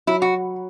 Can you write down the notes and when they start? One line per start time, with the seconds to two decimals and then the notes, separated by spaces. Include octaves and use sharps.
0.07 F#3 E4
0.22 F#4